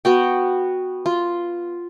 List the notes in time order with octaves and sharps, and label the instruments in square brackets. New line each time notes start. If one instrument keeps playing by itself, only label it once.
[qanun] B3 F#4 G5
F4